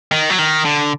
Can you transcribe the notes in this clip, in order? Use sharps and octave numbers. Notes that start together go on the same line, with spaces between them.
D#3
F#3
D#3
D3